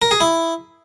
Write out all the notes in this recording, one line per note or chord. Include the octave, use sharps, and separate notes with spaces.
A#4
G#4
E4